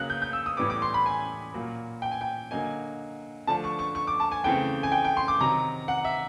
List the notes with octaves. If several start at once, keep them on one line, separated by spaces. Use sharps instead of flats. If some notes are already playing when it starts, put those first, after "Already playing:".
Already playing: C#3 F#3 A#3 C#4 F#6
G6
G6
E6
D#6
A2 E3 G3 B3 D6
D6
C6
B5
G#5
A#2 F#3 A#3
G5
G#5
G5
D3 F#3 A#3 D#4 G#5
D3 F3 A3 D4 A5
C#6
C#6
C#6
D6
A5
G#5
C#3 E3 A3 C4 G5
G#5
G5
G5
C6
D6
C3 D#3 F#3 A#5
F#5
E5